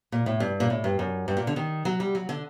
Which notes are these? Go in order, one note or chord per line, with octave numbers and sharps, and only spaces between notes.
A#2
A2
G2
A#2
A2
G2
F#2
G2
A#2
D3
D#3
F#3
G3
F#3
D3